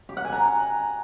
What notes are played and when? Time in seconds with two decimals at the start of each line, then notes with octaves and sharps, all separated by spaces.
0.09 G4
0.17 F#5
0.25 G#5
0.32 A#5